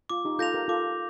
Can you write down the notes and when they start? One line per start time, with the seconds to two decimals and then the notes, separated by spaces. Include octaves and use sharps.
0.10 F4 D6
0.25 D#4 G4
0.39 F4 A4 G6 A#6 F7
0.54 G4 A#4
0.68 F4 A4 D6